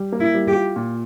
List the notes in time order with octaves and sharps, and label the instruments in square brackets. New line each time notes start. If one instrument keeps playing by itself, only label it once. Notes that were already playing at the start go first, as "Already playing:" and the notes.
Already playing: [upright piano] G3
A#3
[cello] E4
[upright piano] G3
[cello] G4
[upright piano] F4
A#2